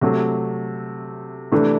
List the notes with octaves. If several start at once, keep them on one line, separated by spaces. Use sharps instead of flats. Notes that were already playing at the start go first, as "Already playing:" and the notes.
C3 F#3 A3
C3 E3 A3 D4